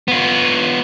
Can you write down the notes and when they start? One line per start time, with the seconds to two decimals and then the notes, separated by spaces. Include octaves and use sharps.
0.08 B3 F4